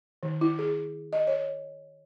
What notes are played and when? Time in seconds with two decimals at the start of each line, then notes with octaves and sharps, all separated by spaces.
0.23 D#3
0.41 E4
0.59 G#4
1.13 D#5
1.27 C#5